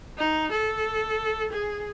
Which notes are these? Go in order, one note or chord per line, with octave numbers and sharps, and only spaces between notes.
D#4
A4
G#4